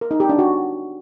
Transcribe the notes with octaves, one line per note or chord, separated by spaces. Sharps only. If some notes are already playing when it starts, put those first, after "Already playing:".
A#4
D#4
G4
D4
F#4